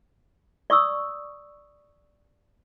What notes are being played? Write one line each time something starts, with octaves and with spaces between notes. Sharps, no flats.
D5 C#6 D#6 E6